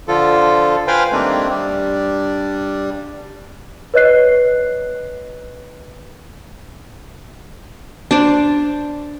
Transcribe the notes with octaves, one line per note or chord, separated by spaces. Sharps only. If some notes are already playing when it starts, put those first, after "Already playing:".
D3 F3 F4 A4
B4 C5 F5 G5 G#5
G2 D#3 A3 A#3 C4 D4
G2 G3 D4
B4 C#5 D#5 F#6 C7
D4 C5 D5